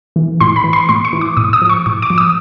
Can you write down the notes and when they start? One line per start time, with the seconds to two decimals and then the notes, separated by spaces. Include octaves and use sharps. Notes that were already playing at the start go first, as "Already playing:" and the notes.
0.16 E3
0.40 A2 C6
0.56 B5
0.64 E3
0.73 C6
0.89 A2 C6
1.05 C#6
1.13 E3
1.21 D6
1.37 A2 D#6
1.53 D#6
1.62 F3
1.69 C#6
1.86 A2 D6
2.02 D6
2.10 F3
2.18 D#6